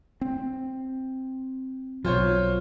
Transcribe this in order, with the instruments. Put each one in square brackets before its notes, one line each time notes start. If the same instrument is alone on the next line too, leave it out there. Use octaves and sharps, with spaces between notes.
[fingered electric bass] C4
[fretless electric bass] B1 F#3 [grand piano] F4 C5 C#5